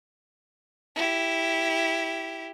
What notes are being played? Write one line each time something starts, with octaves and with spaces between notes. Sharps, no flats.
E4 G4